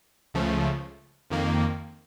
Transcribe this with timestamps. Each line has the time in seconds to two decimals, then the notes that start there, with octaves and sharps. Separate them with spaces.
0.34 C#2 C#3 F3 A3
1.30 F2 D#3 A#3